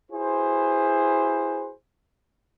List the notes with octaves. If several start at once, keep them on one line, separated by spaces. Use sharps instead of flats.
E4 F#4 G#4 B4 C5